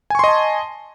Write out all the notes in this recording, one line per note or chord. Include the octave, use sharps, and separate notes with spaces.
D#5 G#5 A5 C6 C#6